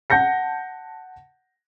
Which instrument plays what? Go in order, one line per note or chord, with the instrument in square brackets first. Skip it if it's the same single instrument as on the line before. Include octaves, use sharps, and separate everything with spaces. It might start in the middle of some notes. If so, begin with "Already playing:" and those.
[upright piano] F#5 A5 G6 A#6 C#7